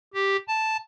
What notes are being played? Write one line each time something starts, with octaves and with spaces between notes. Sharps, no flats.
G4
A5